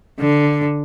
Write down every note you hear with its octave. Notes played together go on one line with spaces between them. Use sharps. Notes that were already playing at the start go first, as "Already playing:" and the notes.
D3